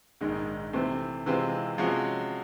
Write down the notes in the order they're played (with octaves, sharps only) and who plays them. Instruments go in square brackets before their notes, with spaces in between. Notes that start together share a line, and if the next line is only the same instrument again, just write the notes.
[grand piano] A#1 G#2 D#3 G#3
C3 E3 A3 C4
C3 E3 G#3 C4 F4
C3 F3 G#3 C#4 F#4